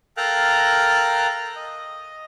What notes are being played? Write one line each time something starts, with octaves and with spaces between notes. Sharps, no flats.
A4 A#4 F5 G5 A#5 F#6
D#5